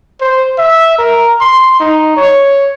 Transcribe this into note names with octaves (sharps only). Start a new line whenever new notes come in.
C5
E5
A#4
C6
D#4
C#5